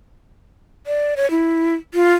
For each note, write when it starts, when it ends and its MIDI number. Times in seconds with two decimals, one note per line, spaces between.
0.87 1.14 74
1.17 1.29 73
1.31 1.75 64
1.94 2.13 65